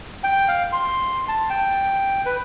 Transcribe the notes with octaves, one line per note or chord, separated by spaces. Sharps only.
G5
F5
C6
A5
G5
B4